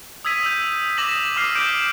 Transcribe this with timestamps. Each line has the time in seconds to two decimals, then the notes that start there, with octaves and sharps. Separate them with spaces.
0.25 D#6 E6 G#6 B6 D#7
0.43 E6 G6
0.98 D6 D#6 A#6 B6 E7 F#7
1.37 D6 F6 C7
1.55 D6 G6 B6 D7